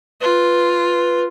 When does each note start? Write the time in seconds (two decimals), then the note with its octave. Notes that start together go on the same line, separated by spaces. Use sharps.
0.21 F4 B4